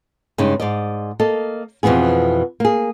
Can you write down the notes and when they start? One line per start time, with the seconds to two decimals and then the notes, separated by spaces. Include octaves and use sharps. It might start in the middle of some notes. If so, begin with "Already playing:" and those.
0.38 G2 C#3 G#3 D#4
0.60 G#2 D5 D#5
1.20 A#3 A4 D#5
1.83 F2 B2 E3 B3 G#4
2.60 A#3 G#4